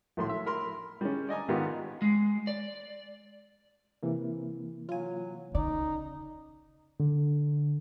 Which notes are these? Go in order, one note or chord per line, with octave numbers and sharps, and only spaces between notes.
B1 A2 C6
E5
A#4 B5 C6
G3 G#3 C#4
D5 D#5 G#5 A#5
G#2 D#3 B3 F4 G4
G#3
D5
C3 E3 A#3
F#3 F4 G#5
C#3 D#4 D5
D3